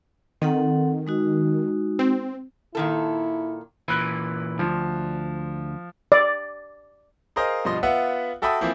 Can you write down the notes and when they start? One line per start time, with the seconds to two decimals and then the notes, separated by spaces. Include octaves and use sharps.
0.42 D#3 C4 A4 F#5
1.07 G#3 D#4 F#4
1.99 C4
2.75 A#2 D#3 E4 A4
3.88 A#2 E3 B5 F#6
4.59 D2 F3
6.12 D5
7.36 G#4 A#4 C5 D#5 F5
7.65 G2 B2 F3 D#5 C6
7.83 B3 F4 E5 F#5
8.42 F#4 A4 E5 G5 B5 D#6
8.61 E3 F3 A#3 C4 E4